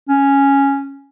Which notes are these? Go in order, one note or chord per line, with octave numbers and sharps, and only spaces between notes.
C#4